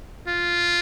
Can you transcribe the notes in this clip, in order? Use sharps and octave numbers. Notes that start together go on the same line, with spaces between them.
F4